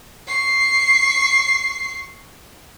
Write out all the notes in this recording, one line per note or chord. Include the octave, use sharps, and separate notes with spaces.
C#6 C7